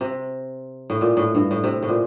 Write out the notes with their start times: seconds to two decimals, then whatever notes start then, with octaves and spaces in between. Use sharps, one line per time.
0.01 C3
0.90 A2
1.01 A#2
1.17 A2
1.35 G2
1.51 A2
1.64 C3
1.83 A2
1.89 A#2